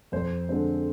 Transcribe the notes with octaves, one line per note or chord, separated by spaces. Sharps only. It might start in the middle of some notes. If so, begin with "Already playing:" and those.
F2 C5
D3 G#3 C4 C5